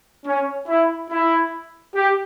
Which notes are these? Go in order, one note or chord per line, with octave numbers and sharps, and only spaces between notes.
C#4
E4
E4
G4